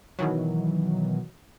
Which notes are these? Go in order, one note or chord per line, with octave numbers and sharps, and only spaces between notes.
B2 D#3 E3 F#3